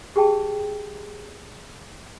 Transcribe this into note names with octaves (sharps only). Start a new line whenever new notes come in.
G4 G#4 G5 A5